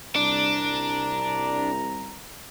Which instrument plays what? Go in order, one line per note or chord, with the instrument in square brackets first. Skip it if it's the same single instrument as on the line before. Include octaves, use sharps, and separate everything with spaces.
[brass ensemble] C2 A#5 [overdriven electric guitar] D4